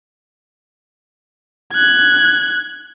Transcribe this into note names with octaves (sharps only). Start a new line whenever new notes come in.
F#6 G#6